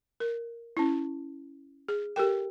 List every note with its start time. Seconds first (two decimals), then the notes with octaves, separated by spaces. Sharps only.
0.20 A#4
0.77 C#4 E4
1.88 G#4
2.16 G4 A4 A#4 G5